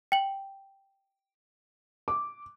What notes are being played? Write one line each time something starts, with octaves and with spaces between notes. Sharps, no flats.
G5 F#7
D6